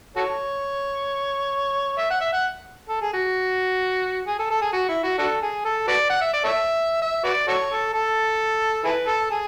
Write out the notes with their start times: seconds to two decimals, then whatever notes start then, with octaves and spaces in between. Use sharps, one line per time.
0.16 F#4 A4 C#5
1.98 E5
2.10 F#5
2.21 E5
2.33 F#5
2.89 A4
3.01 G#4
3.13 F#4
4.27 G#4
4.39 A4
4.50 A4
4.62 G#4
4.73 F#4
4.89 E4
5.03 F#4
5.19 D4 F#4 A4
5.42 G#4
5.65 A4
5.88 F#4 B4 D5
6.10 F#5
6.21 E5
6.33 D5
6.44 A4 C#5 E5
7.02 E5
7.24 F#4 B4 D5
7.48 F#4 A4 C#5
7.71 A4
7.93 A4
8.84 E4 G#4 B4
9.07 A4
9.31 G#4